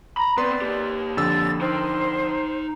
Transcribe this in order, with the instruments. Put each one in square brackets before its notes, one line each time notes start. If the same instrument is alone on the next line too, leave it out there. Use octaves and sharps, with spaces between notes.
[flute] A#5 [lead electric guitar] B5
[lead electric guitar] B3 C4 [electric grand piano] B4 C6 [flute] D5
[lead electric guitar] A#3 G4
[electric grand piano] F2 D3 E6 [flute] A6
[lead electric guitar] D#4 G5 [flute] C5